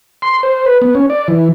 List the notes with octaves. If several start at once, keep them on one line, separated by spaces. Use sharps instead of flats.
C6
C5
B4
B3
C#4
D5
E3